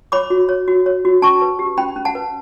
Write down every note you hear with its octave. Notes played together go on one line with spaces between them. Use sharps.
C#5 B5 D6
F#4
C#5
F#4
C#5
F#4
C#4 A5 C#6
B4
G4
C#4 G5 B5
C#4
F#5 A5
B4